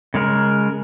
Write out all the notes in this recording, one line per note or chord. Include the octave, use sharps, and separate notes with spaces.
C#3 G#3 A#4